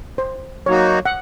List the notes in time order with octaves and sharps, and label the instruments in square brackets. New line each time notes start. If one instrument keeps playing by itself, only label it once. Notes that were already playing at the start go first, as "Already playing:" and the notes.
[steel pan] C5
[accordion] F#3 A#3 D#4 F#4 [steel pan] C#5
[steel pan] F#5